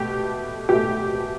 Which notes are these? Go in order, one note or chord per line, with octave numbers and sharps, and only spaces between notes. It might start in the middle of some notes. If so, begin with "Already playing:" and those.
Already playing: B2 A3 G4
B2 A3 G4